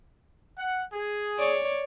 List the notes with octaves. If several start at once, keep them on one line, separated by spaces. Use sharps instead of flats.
F#5
G#4
C#5 D5